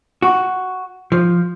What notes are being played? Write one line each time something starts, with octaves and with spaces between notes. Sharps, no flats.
F#4
F3